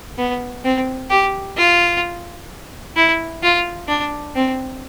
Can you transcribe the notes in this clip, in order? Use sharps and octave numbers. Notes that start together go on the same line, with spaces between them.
B3
C4
G4
F4
E4
F4
D4
C4